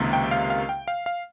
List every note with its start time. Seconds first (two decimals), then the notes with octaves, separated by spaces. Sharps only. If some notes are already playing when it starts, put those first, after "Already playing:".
Already playing: C#2 C3 D#3 A#3
0.13 G5
0.31 F5
0.50 F5
0.69 G5
0.88 F5
1.06 F5